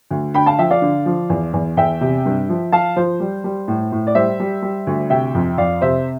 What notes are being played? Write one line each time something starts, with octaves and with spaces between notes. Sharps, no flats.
D2
D3 G5 B5
F5 A5
F3 E5 G5
D5 F5
D3
F3
E2
E2
E2 E5 G5
C3
G2
F3
F3 F5 A5
F3 C5
G3
G3
A2
A2
D5
G3 C5 E5
G3
G3
D2
C3 E5 G5
F2
F2 D5 F5
C3 C5 E5